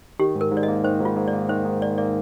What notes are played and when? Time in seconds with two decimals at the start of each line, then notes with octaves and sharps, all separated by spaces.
0.20 D#3 G4
0.35 G#2
0.41 A#4
0.52 G#2
0.57 D5
0.63 D#5
0.68 A#3
0.84 D#3 C5
1.00 G#2 F4
1.16 G#2
1.28 D5
1.33 A#3
1.49 D#3 C5
1.65 G#2
1.81 G#2 D5
1.98 A#3 D5